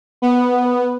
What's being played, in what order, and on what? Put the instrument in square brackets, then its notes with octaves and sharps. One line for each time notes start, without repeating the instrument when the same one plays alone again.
[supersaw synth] B3